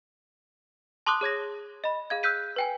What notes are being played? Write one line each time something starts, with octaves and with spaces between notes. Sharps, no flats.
A5 C6 D6 D#6 F#6
G#4 C#5 G#6 A#6
D#5 B5
G#4 F5 G#6
E6 F#6 G6 B6 D#7
B4 G5 G#5